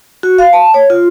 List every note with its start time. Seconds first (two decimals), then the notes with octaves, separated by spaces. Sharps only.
0.23 F#4
0.38 F5
0.53 A5
0.74 C#5
0.90 F4